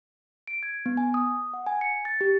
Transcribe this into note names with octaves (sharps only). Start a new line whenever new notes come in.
D7
G#6
B3
G#5
D#6
F#5
G#5
C#7
A6
G4